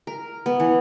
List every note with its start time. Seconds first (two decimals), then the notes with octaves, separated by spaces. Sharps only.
0.07 A#4
0.46 B3
0.60 E3